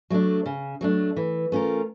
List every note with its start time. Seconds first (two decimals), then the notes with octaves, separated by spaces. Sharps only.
0.10 F#3 A3 D4
0.46 C#3
0.81 F#3 A3 D4
1.16 E3
1.52 A3 C#4 F4 A#4